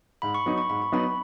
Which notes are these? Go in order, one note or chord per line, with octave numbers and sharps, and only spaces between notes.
G#2 B5
C#6
F#3 B3 D#4 B5
C#6
G#2 B5
C#6
F#3 B3 D#4 B5